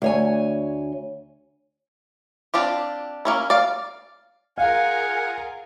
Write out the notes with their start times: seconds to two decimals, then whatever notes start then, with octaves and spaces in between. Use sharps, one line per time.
0.02 D2 C#5 G#5
2.54 C4 D4 F4 G4
3.25 A#3 C#4 E4
3.50 D5 F5
4.58 F4 G#4 A#4 F5 F#5 G#5